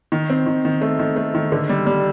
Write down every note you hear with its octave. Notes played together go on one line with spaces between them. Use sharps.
D#3
C4
D#3
D#3
A3
D#3
A3
D#3
D3
G3
G3